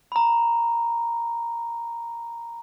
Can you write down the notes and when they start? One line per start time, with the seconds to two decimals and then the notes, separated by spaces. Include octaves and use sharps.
0.12 A#5 B5